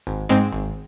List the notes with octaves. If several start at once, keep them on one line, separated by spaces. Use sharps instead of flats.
G#1
G#2 G#3 C4
G#1